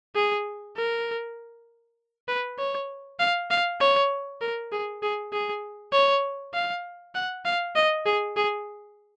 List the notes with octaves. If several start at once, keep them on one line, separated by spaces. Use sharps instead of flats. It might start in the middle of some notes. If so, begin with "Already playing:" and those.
G#4
A#4
B4
C#5
F5
F5
C#5
A#4
G#4
G#4
G#4
C#5
F5
F#5
F5
D#5
G#4
G#4